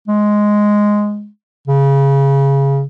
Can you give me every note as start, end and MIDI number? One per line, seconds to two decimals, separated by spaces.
0.08 1.29 56
1.68 2.84 49